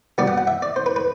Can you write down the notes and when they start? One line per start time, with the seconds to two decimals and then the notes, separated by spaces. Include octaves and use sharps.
0.18 B2 G3 B3 D5
0.27 F#5
0.38 F#5
0.47 E5
0.62 D5
0.76 C5
0.86 B4
0.96 B4